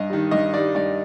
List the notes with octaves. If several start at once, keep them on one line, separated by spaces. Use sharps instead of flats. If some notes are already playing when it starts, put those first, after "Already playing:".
Already playing: G2 D#5
D#3 G3
G2 D#5
D#3 G3 D5
G2 D5